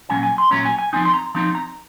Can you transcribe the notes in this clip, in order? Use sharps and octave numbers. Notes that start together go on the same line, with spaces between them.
A#2 F#3 C#4 G#5
G#5
C6
A#2 F#3 C#4 A#5
G#5
G#5
F3 C4 D#4 G#5
C6
A#5
F3 C4 D#4 A#5
A#5